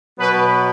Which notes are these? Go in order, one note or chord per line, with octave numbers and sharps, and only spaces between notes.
B2 F#3 B3 B4